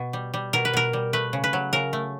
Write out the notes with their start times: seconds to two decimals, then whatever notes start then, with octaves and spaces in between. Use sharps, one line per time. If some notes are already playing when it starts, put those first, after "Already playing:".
Already playing: B2
0.13 G3
0.34 G3
0.53 B2 A#4
0.65 B4
0.73 B2 A#4
0.93 G3
1.13 A3 B4
1.33 C#3
1.44 B4
1.53 F#3
1.73 C#3 A#4
1.93 A3